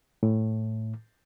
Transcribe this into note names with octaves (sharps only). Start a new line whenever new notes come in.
A2